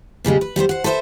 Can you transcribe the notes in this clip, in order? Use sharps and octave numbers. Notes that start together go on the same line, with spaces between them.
A#2 C#3 G3 G#3
B4
G3 B3 E4 C5
C5 F#5
A4 B4 C5 D5 E5